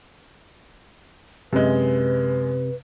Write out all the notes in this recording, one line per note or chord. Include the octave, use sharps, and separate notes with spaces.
F#2 C3 G#3 B4